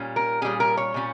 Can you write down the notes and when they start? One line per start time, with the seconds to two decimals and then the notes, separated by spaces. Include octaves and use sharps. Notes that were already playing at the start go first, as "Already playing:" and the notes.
Already playing: A#2 G3 C#4
0.16 A#4
0.42 A#2 G3 C#4 G#4
0.60 A#4
0.77 C#5
0.94 A#2 G3 C#4